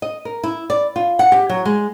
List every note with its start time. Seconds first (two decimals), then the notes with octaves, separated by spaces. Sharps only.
0.02 D#5
0.25 A#4
0.43 E4
0.70 D5
0.96 F4
1.19 F#5
1.32 G4
1.49 F#3
1.65 G#3